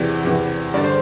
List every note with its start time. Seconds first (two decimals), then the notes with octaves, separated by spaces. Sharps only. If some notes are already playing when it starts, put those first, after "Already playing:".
Already playing: E2 C3 E3 D5
0.25 E2 C3 E3
0.74 G2 D3 D5
0.84 C5